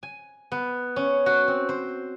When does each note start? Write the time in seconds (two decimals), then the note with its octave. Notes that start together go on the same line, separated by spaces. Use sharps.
0.03 G#5
0.52 B3
0.96 C#4
1.26 F#4
1.48 C4
1.69 C5